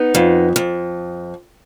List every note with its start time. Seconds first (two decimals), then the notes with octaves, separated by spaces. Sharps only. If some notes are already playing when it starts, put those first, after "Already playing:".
Already playing: B3 D#4
0.15 F2
0.56 F2